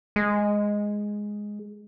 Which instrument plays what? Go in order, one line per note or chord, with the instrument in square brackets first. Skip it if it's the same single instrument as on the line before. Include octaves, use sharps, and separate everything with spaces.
[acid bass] G#3